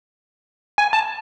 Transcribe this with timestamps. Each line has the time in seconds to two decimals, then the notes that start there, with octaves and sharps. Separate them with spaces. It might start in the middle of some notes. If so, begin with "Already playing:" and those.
0.78 G#5
0.93 A5